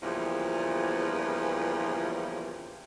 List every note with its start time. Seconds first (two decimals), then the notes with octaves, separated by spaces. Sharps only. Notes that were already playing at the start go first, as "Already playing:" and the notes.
0.03 E2 G2 A#2 C#3 E3 F3